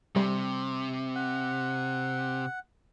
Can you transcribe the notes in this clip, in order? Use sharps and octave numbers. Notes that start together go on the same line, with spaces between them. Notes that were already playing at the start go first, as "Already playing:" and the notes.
C3 G3
F#5